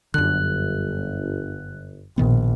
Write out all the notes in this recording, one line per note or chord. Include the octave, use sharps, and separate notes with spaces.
G1 F#2 D3 F#6
A#1 B2 D#3 B3